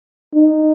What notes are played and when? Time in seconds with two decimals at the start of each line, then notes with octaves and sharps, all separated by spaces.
0.34 D#4